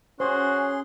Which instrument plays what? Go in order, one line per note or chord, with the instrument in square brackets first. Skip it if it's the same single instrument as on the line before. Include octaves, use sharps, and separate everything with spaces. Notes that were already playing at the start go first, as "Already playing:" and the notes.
[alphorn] C#4 [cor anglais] F#4 [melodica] G#4 C6 [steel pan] C5